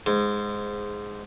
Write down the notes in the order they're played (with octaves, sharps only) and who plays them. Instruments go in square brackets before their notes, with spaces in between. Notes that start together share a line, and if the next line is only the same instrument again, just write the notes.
[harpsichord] G#2